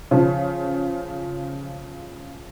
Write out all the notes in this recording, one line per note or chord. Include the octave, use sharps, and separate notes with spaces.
C#3 F3